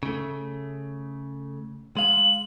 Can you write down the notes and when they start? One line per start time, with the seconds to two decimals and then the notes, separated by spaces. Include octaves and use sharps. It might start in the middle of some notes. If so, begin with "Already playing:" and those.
0.03 C#3 A3
1.97 G#3 F5 F#7